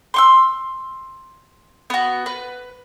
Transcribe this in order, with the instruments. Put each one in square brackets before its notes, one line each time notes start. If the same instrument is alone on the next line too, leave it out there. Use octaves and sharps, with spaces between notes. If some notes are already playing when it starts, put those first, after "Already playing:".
[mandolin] C6 C#6 E6
B3 F#4
B4